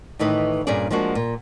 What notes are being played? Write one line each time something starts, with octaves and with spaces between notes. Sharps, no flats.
A2 D#3 E3 B4 D#5
G2 A#2 C#4 G#4 D5
F3 G#3 A#3 D4 F#4
A#2